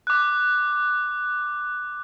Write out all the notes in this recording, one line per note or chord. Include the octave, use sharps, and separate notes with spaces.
D6 F#6